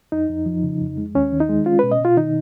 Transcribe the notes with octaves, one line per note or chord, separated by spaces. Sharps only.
F2 D#4
F2
F3
C#3
F2
G#3
D#2 C#4
D#3
D#4
G#3
C#4 F4
B2 B4
D#5
B2 F4
D#3 D#4